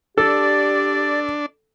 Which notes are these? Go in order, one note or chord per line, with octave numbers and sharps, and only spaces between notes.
D4 G4 A4 D5